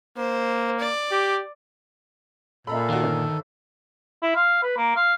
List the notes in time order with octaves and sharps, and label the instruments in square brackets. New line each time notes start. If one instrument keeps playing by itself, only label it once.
[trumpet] A#3 [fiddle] C5
[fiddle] D5
[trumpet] G4
[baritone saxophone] A#2 [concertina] A4 [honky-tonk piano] E5 A#5 B5
[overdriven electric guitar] D#3 [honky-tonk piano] F4 F#4
[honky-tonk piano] G1
[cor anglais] E4
F5
B4
A#3
F5